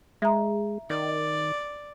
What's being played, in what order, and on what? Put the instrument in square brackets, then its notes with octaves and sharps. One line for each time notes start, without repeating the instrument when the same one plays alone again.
[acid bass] G#3 [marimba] E5 A#5
[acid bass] D#3 [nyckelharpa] D5